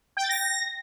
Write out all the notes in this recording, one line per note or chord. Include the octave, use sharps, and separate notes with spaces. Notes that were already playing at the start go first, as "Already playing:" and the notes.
G5
A6
A#6